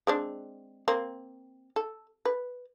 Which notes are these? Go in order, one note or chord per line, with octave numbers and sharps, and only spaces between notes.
G#3 C4 D4
A#3 C4
A4
B4